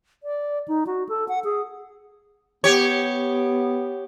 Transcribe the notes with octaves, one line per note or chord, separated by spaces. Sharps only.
D5
D#4
F#4
A4
F#5
G#4
B3 G4 C#5